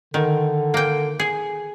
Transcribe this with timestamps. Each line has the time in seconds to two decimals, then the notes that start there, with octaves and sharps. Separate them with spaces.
0.14 D3 D#3
0.74 A#3 G5
1.20 G#4